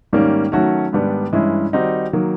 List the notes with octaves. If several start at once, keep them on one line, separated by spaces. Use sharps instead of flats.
G#2 D#3 G3 A#3 C#4
D#3 F#3 A3 C#4 F#4
G#2 D#3 G3 B3 D4
G2 E3 G#3 C#4 E4
D#3 G3 C4 D#4 F#4
D#3 F#3 A#3